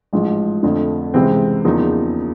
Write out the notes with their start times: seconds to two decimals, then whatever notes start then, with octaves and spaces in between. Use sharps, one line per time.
0.13 A1 G#2 F3
0.63 F2 D3 F3 A3
1.14 C#2 C3 E3 G#3 C4
1.65 E2 C#3 F3 A#3 D#4